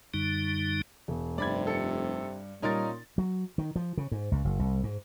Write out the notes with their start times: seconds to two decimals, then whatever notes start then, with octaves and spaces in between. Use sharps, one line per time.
0.14 F#2 D3 G3 D#4
1.08 E1
1.38 F1 G2 C3 D5 B5 G#6
1.67 A4 C#7
2.62 A#2 G3 C#4 D#4 F4 A#4 A6
3.18 F#3
3.58 D#3
3.76 F3
3.97 C#3
4.12 G#2
4.32 C#2
4.44 F#1
4.59 C2
4.83 G#2